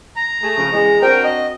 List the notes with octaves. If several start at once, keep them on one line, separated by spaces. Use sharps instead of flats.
A#5
A3 G#4
C#3 F3
E2 G#3
C4 D4 F#4 A#4 C5 G5
D#5